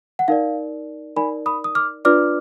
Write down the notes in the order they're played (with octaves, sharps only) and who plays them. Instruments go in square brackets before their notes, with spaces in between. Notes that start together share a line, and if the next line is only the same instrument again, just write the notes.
[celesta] F#5
D#4 A#4 D5 F5
D#4 A#4 D5 G#5 B5
B5 D#6
D#6
D6 F6
D4 F4 B4 D5 D6 F6